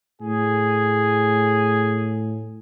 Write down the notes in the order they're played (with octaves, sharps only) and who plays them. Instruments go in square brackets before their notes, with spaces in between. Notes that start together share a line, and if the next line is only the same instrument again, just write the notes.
[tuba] A2 [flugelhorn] G#4